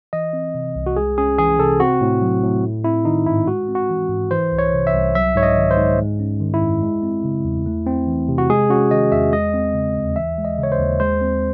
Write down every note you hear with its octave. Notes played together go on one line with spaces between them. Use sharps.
E3 D#5
C4
C3
C2
F#4
G#3 G#4
C#4 G#4
E3 G#4
C3 A4
C4 F#4
A2
F#3
A2
A3
C4 E4
D#3 D#4
G#2 E4
G#3 F#4
C4
F#4
E3
G#2
E3 C5
C2
C#5
C3
E5
C2
F#3 E5
G#2 C#5
D#5
D#3
C5
G#2
G#3
C#4
D#3
E4
F#2
G#3
C4
C#3
E2
A3
C4
E3
C3
F#4
G#3 G#4
C#4 F#4
D#3 D#5
E2 E5
G#3 D#5
C4
C#3
D#2
E3 E5
G#3
D#5
C#3 C#5
C5
D#2
G#3 C5
C4